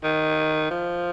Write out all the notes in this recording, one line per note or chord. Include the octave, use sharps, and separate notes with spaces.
D#3
F3